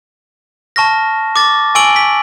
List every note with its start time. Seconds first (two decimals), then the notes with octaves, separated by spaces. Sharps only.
0.76 A5 C#6 F6 A#6
1.36 D6 A6
1.75 G#5 C#6 E6 D7 F#7
1.96 B6